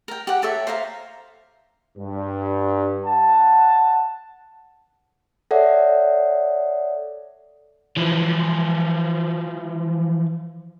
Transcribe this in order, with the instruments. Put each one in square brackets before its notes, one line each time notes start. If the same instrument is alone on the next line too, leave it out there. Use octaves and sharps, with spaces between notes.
[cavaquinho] A#4 G5
G4 F#5
G4 A4 C#5 E5
C5 E5 F5 A#5
[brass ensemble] G2
F#5 A5
[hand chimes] A4 C#5 D5 E5 F#5
[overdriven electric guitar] E3 F3